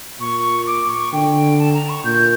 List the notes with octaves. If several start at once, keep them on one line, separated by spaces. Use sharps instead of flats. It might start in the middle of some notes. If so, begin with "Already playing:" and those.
A#2 C#6
D6
C#6
D3 G5
A5
A#5
C#6
A#2 G6